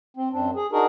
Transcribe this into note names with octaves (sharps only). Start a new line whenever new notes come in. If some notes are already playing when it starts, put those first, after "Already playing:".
C4
F#2 C4 D4
G#4
D4 D#4 F#4 G#4 A#4